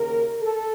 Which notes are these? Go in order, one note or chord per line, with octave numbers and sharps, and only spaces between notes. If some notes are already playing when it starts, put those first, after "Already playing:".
Already playing: D#2 C#3 A#4
A4